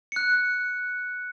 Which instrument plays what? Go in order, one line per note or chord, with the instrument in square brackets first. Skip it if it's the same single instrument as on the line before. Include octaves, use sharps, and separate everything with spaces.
[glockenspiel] F#6 C#7